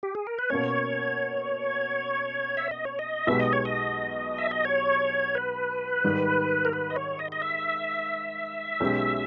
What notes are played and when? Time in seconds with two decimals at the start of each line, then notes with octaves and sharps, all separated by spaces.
0.03 G4
0.15 G#4
0.27 A#4
0.39 B4
0.50 B2 A#3 C#4 C#5
2.57 E5
2.71 D#5
2.85 C#5
2.99 D#5
3.27 B1 B2 G#3 B3 G4 E5
3.40 D#5
3.53 C#5
3.65 D#5
4.38 E5
4.51 D#5
4.65 C#5
5.35 B4
6.04 G#2 D#3 G3
6.65 A#4
6.73 B4
6.90 D#5
6.96 C#5
7.19 D#5
7.32 D#5
7.42 E5
8.80 B1 B2 G#3 C#4 G4